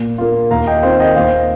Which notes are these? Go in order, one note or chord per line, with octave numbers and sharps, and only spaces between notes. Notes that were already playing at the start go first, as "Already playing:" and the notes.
Already playing: A#2
A#3 F4
D#2 F5 A#5
D#5 G5
D#3 C4 F4 C5 F5
D#5 G5
D#2 C5 F5